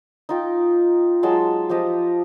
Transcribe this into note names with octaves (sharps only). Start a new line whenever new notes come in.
D#4 F4 G5
F#3 G#3 A5 C6
F3 G4 D#5 F5